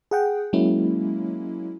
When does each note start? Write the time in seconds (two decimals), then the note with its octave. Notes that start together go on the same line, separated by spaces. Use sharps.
0.11 G#4 F#5 G5
0.53 F#3 G#3 A#3 C#4 E4